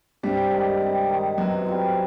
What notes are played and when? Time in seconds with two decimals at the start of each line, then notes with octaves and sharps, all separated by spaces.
0.23 G2 C3 G3
0.52 D#3 G#3
0.81 C3
1.09 D#3 G#3
1.38 F#2 B2 F#3
1.66 G3 C4 F4